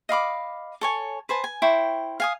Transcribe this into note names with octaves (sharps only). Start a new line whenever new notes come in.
D#5 F5 B5 D6
A4 C#5 G#5
B4 C5 G#5 A5
G#5
E4 C5 G5 C#6
F5 G#5 D#6